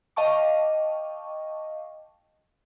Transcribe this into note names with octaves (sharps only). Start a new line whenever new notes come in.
D#5 F5 G5 A5 C#6 D6